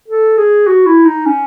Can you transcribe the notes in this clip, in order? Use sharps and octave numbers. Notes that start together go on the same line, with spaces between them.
A4
G#4
F#4
E4
D#4
C#4